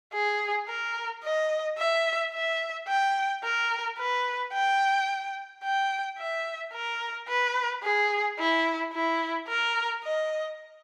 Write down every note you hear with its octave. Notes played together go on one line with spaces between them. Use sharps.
G#4
A#4
D#5
E5
E5
G5
A#4
B4
G5
G5
E5
A#4
B4
G#4
E4
E4
A#4
D#5